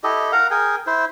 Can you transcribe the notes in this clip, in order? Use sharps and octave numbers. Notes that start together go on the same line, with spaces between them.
E4 G4 A4 D#5
A#4 F5 F#5 A#5
G#4 A#4 G5 G#5
E4 C5